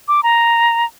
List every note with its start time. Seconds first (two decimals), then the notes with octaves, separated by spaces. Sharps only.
0.08 D6
0.23 A#5